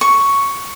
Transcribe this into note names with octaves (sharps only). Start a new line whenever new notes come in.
C#6